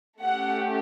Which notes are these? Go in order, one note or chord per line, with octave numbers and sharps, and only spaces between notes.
A3 C#4 G4 F#5